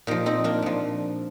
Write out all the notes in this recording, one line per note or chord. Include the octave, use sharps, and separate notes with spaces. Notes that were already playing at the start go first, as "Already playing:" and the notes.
A#2 F3 D#4 G4
C4 D#4
A#3 D4
A#2 F3